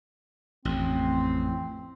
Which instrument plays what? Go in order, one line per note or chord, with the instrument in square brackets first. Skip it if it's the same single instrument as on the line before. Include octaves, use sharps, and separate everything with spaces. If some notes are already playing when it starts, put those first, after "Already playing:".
[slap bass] A1 F2 [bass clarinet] C4